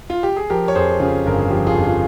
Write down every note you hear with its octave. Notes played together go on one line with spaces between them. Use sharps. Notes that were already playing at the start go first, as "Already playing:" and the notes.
F4
G4
G#4
F3 G4 A#4
C#5
F2 G#4 C5
C#3 F4 G#4
G1 A#4
G#4
F3 G4
F4 G#4
F2
F4